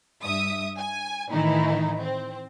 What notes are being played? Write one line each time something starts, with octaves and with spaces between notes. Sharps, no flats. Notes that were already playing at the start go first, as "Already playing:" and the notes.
G2 E5 D#6
G#5
A2 D#3 E3 D#4 E4
C4